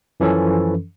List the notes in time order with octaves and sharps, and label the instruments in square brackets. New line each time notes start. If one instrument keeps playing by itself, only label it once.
[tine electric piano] F#2 E3 F3 C#4 A4